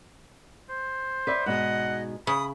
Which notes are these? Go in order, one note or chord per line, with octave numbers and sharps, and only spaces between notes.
C5
B4 D5 E5
G#2 B2 G#3 D#5 F#5
C#3 B5 D#6